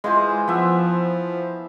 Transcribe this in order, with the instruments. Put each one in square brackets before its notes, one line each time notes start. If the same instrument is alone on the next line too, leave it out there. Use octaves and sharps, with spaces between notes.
[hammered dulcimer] E3 F4 C5 [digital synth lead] G#3
[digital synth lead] F3 [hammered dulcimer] B3 E5